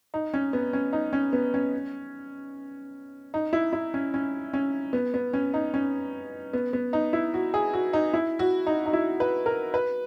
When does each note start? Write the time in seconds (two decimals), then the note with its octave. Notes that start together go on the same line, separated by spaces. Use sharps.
0.14 D#4
0.34 C#4
0.53 B3
0.73 C#4
0.93 D#4
1.13 C#4
1.33 B3
1.54 C#4
3.34 D#4
3.53 E4
3.73 E4
3.94 C#4
4.14 C#4
4.53 C#4
4.93 B3
5.14 B3
5.33 C#4
5.54 D#4
5.74 C#4
6.53 B3
6.73 B3
6.93 D#4
7.13 E4
7.34 F#4
7.54 G#4
7.73 F#4
7.93 D#4
8.14 E4
8.39 F#4
8.67 D#4
8.86 D#4
8.93 E4
9.20 B4
9.46 A#4
9.74 B4